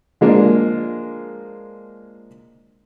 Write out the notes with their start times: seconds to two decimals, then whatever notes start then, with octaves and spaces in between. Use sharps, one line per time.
0.21 F3 G#3 A#3 D4